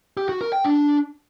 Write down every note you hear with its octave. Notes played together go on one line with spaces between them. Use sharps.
G4
F#4
A#4
G5
D4